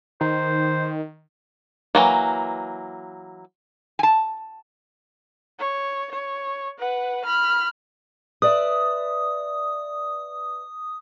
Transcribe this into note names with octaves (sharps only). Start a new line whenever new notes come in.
D#3 C5
E3 F#3 A#3
G#5 A5
C#5
C#5
B4 F#5
B5 F6
B4 D5 E5 D#6